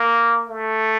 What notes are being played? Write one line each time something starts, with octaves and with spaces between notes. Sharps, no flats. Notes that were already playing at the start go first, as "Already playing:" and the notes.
Already playing: A#3
A3